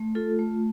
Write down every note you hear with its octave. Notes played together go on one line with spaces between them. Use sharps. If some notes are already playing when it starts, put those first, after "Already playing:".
Already playing: A3
F4 A4
A3